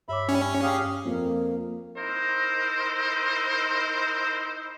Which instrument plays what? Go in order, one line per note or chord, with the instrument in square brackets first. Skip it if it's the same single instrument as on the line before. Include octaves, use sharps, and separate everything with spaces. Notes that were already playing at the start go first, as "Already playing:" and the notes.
[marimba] G2 C#5 D6 [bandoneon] E5 B5
[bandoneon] G3 [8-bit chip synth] C#4
[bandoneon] G4 G#4 F5
[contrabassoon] F2 [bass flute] A#3
[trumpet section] D#4 E4 C5 [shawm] A#4